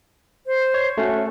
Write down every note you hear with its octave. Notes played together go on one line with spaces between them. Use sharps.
C5
C#5
A3 C#4 F#4